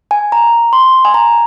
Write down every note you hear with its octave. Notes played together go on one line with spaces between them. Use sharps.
G#5
A#5
C6
G#5
A#5